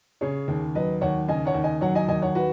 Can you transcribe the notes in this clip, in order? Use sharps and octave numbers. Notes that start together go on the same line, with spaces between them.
C#3 G#4 C#5
D#2
F#3 B4 D#5
D#2 C#5 F#5
C#3 D#5 G#5
C#5 F#5
D#2
D#5 G#5
F#3 C#5 F#5
D#5 G#5
D#2 D#5 G#5
C#5 F#5
F#4 B4